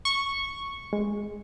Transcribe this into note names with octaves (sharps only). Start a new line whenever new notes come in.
C#6
G#3